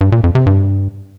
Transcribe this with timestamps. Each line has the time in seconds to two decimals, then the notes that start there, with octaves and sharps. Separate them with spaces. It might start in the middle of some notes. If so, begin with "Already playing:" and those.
0.01 G2
0.12 A#2
0.24 F2
0.35 C3
0.46 G2